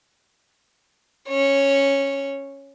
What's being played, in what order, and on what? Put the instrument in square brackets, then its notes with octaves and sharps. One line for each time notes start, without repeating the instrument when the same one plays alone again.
[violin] C#4 C#5